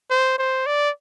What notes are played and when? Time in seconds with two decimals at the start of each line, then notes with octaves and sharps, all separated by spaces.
0.10 C5
0.39 C5
0.67 D5